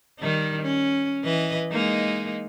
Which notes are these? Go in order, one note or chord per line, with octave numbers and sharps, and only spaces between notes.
D#3 G3 D#4
C#4
E3 B4 D#5
G#3 A#3 D#4